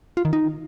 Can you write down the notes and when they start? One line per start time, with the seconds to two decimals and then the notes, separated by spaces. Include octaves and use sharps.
0.17 F4
0.25 D#3
0.33 D#4